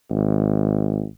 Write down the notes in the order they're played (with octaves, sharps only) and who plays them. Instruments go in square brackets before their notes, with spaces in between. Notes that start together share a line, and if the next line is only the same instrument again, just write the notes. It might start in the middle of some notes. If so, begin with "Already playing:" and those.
[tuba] G#1